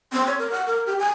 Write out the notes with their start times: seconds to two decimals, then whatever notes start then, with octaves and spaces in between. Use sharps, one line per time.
0.13 C4
0.27 C#5
0.39 A#4
0.52 F#5
0.67 A#4
0.86 G4
0.99 G#5